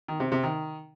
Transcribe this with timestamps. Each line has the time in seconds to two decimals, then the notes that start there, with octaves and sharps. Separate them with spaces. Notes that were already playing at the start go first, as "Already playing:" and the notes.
0.08 D#3
0.20 C3
0.32 C3
0.43 D#3